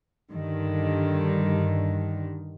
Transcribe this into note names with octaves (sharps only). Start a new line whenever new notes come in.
G2 D3 D#3